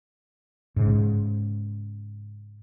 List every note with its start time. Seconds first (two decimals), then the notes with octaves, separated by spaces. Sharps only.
0.76 G#2 C#3